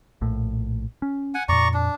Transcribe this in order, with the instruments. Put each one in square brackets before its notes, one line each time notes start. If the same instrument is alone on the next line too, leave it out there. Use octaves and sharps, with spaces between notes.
[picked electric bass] A#1 A2
C#4
[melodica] F#5 G#5
[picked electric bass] F2 A#2 [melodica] D5 A#5 C#6
[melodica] D4